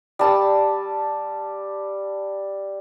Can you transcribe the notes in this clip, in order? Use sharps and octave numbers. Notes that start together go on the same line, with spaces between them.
G3 A5 E6